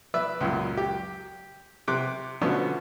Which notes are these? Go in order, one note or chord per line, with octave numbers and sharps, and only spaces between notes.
B4 D5 E5 E6
C#2 F#2 A#2
G4
C3 D6 F#6
B2 D3 F3 A3 B3 C#4